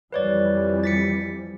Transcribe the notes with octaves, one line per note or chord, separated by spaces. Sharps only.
F2 E3 G3 B4 C#5 D5
A6 B6 C#7